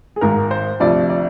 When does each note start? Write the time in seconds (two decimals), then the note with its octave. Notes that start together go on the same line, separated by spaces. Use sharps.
0.16 G#4
0.21 G#1 G#2 D#3 A#4
0.51 C5
0.80 D2 C3 F3 D5
1.10 D5